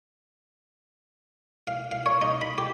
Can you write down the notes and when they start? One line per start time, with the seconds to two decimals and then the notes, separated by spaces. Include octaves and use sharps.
1.67 F5
1.91 F5
2.06 C#5
2.22 D#4
2.41 B5
2.58 G4